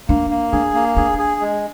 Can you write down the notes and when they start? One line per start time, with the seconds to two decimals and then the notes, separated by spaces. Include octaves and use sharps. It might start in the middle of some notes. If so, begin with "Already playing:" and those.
0.08 A#3 D4
0.30 A#3
0.52 D4 G#4
0.75 A#3
0.97 D4 G#4
1.19 G#4
1.41 G#3